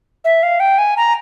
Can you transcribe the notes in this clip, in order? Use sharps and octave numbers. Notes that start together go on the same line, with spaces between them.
E5
F5
G5
G#5
A#5